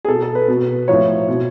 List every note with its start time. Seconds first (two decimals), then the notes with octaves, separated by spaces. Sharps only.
0.05 G#4
0.08 B2 A4
0.22 A4
0.35 B4
0.48 B2
0.88 A2 F3 C#5
1.28 B2